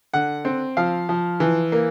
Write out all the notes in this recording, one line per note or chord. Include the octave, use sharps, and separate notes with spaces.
D3 F#5
C4
F3 F5
F3
E3
A#3